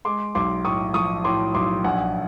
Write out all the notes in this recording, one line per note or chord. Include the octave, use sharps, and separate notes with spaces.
G#3 C6 D6
B1 C6 D6
A2 C#6 D#6
F3 C#6 D#6
A2 C6 D6
B1 C6 D6
A#1 F#5 G#5